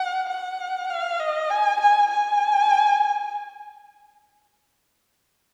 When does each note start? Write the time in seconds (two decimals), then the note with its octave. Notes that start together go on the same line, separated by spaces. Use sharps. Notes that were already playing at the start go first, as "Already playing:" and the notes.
Already playing: F#5
0.29 F#5
0.89 F5
1.20 D#5
1.50 G#5
1.80 G#5
2.10 G#5